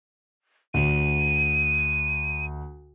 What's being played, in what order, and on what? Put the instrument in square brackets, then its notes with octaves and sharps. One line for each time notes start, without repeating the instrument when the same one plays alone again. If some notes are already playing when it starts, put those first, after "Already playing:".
[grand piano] D2 [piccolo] D#7